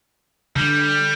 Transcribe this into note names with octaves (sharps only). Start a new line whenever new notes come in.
D3 G3